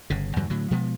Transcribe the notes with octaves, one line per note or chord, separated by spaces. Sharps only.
G1 C#3
E2 G2 D3 F#3
A2 D3 F#3
B2 F3 G#3 B3